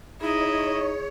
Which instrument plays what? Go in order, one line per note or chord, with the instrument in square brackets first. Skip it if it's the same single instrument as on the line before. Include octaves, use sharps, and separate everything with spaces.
[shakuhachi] D#4 [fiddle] E4 D#5 [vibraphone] G#4 [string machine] C#5